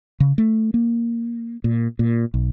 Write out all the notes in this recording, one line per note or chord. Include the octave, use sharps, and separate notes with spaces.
C#3
A3
A#3
A#2
A#2
B1